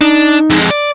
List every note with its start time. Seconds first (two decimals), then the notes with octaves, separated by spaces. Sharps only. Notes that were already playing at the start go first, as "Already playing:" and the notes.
0.01 D4 D#4
0.50 F2 G#3
0.70 D5